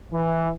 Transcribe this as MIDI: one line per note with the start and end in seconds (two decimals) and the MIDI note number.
0.11 0.49 52